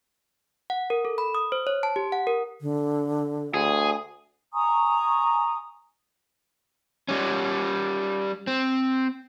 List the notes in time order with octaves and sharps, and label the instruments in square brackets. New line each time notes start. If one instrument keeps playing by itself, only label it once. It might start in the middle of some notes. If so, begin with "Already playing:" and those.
[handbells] F#5
A#4
A4
B5
D#6
C5
C#5
A5
G4
F#5
A#4
[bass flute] D3
[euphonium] D2 [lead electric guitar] G#4
[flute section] G#5 A#5 C#6 D#6
[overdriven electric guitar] G3 C#4
C4